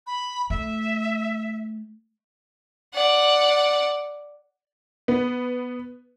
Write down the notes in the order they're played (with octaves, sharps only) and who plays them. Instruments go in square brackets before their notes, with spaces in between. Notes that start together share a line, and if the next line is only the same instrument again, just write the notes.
[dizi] B5
[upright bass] A3 [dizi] E5
[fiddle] D5 F#5
[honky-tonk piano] B3